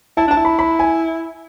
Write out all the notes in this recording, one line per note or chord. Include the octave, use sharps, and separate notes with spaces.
E4 A5
D4 A5
E4
B5
B5
G#5